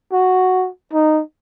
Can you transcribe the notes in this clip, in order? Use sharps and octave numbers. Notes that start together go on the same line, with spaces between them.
F#4
D#4